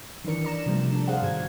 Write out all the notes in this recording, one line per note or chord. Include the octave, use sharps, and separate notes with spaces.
D#3 E3 D4 A#4 C#7
D5 A#5 E7
C3 F3 G3 A3
D4 A4
G#4 C5 F5 F#5
G#2 D#3 F#4 G#6